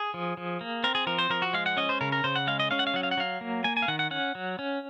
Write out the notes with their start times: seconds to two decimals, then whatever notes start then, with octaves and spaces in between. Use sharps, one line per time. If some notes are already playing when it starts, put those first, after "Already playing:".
Already playing: G#4
0.14 F3
0.37 F3
0.61 A#3
0.84 C4 A#4
0.95 G#4
1.07 F3 A#4
1.18 C5
1.30 F3 A#4
1.42 F#4
1.53 G#3 F5
1.66 F#5
1.77 C#4 D#5
1.89 C5
2.01 C#3 A#4
2.12 A#4
2.24 C#3 C5
2.36 F#5
2.47 G#3 F5
2.60 D#5
2.71 C#4 F5
2.79 F#5
2.87 F5
2.94 F#3 F#5
3.03 F5
3.11 F#5
3.17 F#3 F5
3.41 A#3
3.64 A#3 G#5
3.77 G#5
3.82 F5
3.88 D#3 F#5
3.99 F#5
4.11 C#4 F#5
4.35 F#3
4.59 C#4